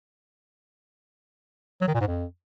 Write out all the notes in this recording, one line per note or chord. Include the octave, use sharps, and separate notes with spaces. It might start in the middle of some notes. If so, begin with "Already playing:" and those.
F#3
D#3
A#2
G#2
F2